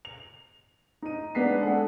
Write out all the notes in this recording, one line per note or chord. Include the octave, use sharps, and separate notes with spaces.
F7
D#4 D#7
G#3 B3 D4 B6 C7
G#3 D4 G#4 A4 F#5